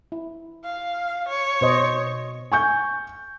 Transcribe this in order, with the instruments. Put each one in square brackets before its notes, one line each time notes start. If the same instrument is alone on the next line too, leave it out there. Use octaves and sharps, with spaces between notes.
[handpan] E4
[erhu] F5
C#5
[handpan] B2 C5 D#5
[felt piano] G#5 C#6 G6